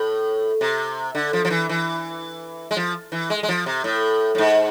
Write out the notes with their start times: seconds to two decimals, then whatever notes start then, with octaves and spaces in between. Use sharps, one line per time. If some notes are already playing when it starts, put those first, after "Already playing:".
Already playing: A2
0.61 C3
1.15 D3
1.33 F3
1.45 F3
1.50 E3
1.69 E3
2.71 G#3
2.76 F3
3.12 E3
3.30 G#3
3.43 G#3
3.49 F3
3.66 C3
3.84 A2
4.35 A2
4.38 G#2